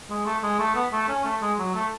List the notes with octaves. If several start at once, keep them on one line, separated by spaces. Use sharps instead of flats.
G#3
A3
G#3
A3
B3
A3
C#4
A3
G#3
F#3
A3